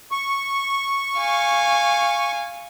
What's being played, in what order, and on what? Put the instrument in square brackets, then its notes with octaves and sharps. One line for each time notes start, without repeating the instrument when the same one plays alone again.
[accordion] C#6
[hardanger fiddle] F5 G#5